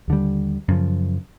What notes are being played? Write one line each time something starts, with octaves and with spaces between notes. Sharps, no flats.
D#2 D3 G3
F#2 C#3 F3